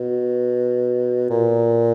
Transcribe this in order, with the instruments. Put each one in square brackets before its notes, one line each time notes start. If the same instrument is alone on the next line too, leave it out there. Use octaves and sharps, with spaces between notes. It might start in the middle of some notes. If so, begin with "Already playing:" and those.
Already playing: [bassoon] B2
A#2